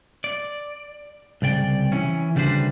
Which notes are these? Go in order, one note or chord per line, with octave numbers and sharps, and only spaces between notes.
D5
C2 C#3 D5 G5
E3 C#4
D2 C#3 G3 D4 B4 C5